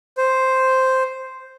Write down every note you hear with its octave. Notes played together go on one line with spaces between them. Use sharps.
C5